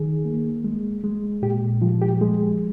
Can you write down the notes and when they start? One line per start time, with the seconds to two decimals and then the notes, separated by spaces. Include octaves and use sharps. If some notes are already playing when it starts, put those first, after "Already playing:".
Already playing: D#3 G#4
0.25 A#3
0.64 G#3
1.04 G#3
1.42 A#2 G4
1.82 F3 F4
2.02 G4
2.21 G#3 G#4